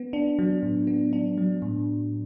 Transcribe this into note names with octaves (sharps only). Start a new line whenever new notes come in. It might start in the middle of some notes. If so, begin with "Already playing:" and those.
Already playing: B3
D4
F#3
A2
B3
D4
F#3
A2